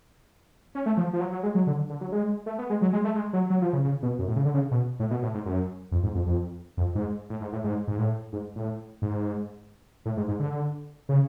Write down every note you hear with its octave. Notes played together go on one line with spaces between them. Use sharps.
C#4
A3
F3
F3
F#3
F#3
G#3
F#3
D3
D3
F#3
G#3
A3
B3
G#3
F#3
G#3
A3
G#3
F#3
F#3
F3
C#3
C#3
B2
F#2
A2
C#3
D3
C#3
B2
A2
B2
A2
G#2
F#2
F2
G#2
F2
F2
F2
G#2
A2
G#2
A2
G#2
G#2
A2
G#2
A2
G#2
A2
G#2
G#2
D3
C#3